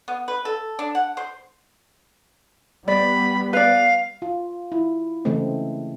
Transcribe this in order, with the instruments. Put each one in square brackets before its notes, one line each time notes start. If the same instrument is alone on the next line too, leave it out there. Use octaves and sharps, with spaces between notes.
[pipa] B3
B4
A4
D4
F#5
C5
[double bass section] G3 B3 [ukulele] D5 [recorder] B5
[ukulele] B4 D5 [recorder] F5
[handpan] F4
E4
C#3 E3 G#3 A3 C4